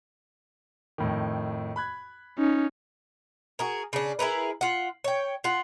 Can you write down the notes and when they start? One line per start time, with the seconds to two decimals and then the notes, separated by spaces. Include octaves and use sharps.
0.98 F2 A2 D#3
1.76 B5 F#6 G#6
2.38 C#4 D#4
3.59 F#4 G#4 A#4
3.93 C#3 D4
4.19 E4 G#4 A#4 B4
4.61 F4 F#5
5.04 C#5 G5
5.44 F4 F#5